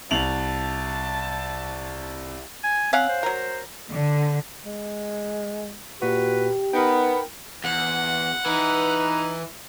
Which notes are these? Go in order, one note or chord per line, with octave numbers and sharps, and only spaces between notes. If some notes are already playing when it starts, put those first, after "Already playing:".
C2 A5 F7 F#7
G#5
C4 C#4 F5 F#5
C5
F#3 A#4
D3
G#3
A#2 F#4 G4 B4
B3 D#4 A#4 G5
E2 F#5
E3 D#4 B4